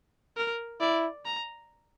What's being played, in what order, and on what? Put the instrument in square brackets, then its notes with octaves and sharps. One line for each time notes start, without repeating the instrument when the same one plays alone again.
[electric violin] A#4
[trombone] E4 [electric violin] D5
[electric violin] A#5